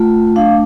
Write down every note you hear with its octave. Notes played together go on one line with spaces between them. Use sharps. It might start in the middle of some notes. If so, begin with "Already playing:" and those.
Already playing: A3 F4 F#5
D4 F5